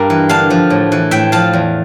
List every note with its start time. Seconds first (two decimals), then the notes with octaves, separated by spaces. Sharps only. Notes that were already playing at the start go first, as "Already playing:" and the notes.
Already playing: G2 A#4 D5 F5
0.10 E3
0.29 D3 F5 A5
0.50 F3
0.70 A2
0.92 E3
1.11 A2 E5 G5
1.32 F3 F5 A5
1.53 E2